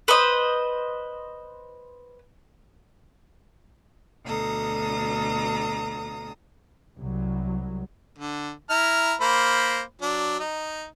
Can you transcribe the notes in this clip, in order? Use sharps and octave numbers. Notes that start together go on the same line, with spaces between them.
B4 C5 D#5
D2 B2 A4 A#5 D#6
C2 F#3
D3
E4 A#5 F6
A#3 C5 B5
F#3 D4
D#4